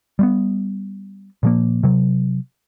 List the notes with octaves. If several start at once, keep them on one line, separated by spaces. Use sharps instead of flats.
G3 A3 B3
A#2 F3 A#3
C3 F#3